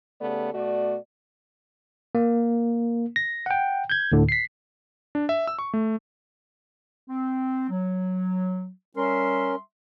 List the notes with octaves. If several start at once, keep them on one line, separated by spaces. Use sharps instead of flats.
C#3 A3 B3 G4 A4 D5
B2 A3 F#4 D5
A#3
A#6
F#5 G5
G6 G#6
D2 A2 D3
B6 C7
D4
E5
E6
C#6
A3
C4
F#3
G3 C#4 A#4 E5 C6